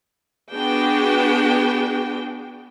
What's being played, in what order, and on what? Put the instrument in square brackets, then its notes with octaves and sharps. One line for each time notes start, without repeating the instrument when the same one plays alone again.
[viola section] B3 D4 F#4 G#4 G5